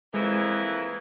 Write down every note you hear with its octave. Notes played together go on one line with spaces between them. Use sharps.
F2 E3 G#3 A#3 E4